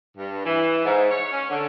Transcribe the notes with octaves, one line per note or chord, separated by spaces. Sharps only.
G2
E3
G#2
C#5
C#4
D3